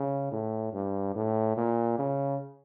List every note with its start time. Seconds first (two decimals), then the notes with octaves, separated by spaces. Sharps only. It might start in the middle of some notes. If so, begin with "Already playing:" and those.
Already playing: C#3
0.32 A2
0.73 G2
1.15 A2
1.57 A#2
1.99 C#3